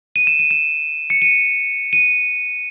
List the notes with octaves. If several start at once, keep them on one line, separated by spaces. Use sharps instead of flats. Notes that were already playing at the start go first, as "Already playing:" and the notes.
D#7
E7
D#7
E7
C#7
D#7
D#7